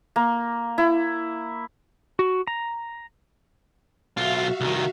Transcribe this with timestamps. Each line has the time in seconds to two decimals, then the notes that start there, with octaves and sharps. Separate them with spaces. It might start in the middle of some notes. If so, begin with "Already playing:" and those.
0.16 A#3
0.78 E4
2.19 F#4
2.47 A#5
4.17 B1 F4 F#4 E5 F5
4.61 C2 D#3